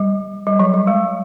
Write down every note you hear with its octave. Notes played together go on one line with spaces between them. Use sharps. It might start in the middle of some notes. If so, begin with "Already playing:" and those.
Already playing: G3
G3
F#3
G3
G#3